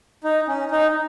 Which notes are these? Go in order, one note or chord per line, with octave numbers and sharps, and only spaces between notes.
D#4
C#4
D#4